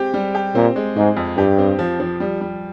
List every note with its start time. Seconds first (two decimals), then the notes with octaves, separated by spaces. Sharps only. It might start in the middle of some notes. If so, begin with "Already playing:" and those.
Already playing: G#3 C4 G4
0.14 G3
0.35 G4
0.55 A#2 C4
0.76 G#3
0.96 G#2 G#3
1.17 F2
1.37 G2 G4
1.58 C4
1.79 F3
2.00 F3
2.20 G3
2.41 G3